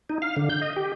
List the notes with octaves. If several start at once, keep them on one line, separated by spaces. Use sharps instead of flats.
D#4
F5
D3
G6
D#5
G4